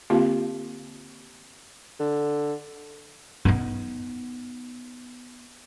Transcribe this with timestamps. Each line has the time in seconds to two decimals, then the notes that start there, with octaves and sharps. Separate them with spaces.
0.10 D3 A#3 C4 F4 G4 F5
2.00 D3
3.45 B3 D#4